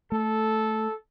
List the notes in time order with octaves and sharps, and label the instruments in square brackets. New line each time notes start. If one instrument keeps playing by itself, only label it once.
[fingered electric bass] A3 [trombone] A4